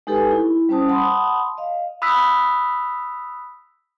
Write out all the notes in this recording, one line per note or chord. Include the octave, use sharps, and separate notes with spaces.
G#3 D#4 G4 A4 B4 G#5
E4
G3 C#4 C5 A5 D#6
F#5 A5 B5 C6 D#6
D#5 F5
B5 D#6 E6 F#6 B6